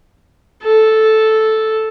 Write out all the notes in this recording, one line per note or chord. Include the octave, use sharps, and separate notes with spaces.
A4